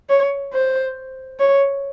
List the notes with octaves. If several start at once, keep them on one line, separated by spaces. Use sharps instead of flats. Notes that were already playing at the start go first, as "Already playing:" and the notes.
C#5
C5
C#5